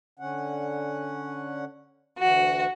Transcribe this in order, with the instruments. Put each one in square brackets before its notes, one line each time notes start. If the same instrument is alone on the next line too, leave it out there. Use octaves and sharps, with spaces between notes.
[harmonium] D3 C#4 F#5
[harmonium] D2 E3 [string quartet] F#4